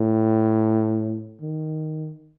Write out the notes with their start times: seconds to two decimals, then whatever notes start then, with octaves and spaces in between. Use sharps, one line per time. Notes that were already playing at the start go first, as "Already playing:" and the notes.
Already playing: A2
1.41 D#3